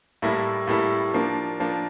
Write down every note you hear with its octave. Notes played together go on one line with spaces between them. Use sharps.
A2 G3 A#3 E4 A4
A2 G3 A#3 E4 A4
F3 A#3 D4
F3 A#3 D4